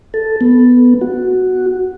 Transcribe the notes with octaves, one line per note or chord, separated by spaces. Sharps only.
A4
B3
F#4